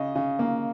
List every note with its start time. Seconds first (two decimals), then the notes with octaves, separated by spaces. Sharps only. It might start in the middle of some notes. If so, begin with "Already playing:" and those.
Already playing: C#3 D#5
0.15 C#3
0.39 A#3